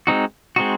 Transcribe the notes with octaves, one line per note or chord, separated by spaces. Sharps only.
G#3 C4 D#4 F#4
G#3 C4 D#4 F#4